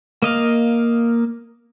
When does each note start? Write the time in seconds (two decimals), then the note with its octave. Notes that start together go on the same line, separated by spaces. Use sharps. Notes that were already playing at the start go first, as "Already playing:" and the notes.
0.22 A#3 D#5 F5